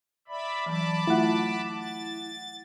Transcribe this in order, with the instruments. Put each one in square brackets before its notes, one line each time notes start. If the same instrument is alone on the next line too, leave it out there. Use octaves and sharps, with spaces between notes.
[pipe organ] D5 E5 B5
[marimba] E3 F#3 [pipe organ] A5 B5 D6
[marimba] A3 F4 [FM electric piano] E4 F#5
[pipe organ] A6